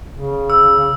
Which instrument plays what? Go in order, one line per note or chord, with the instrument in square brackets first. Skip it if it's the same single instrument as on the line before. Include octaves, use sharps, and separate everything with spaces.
[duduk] C#3
[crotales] E6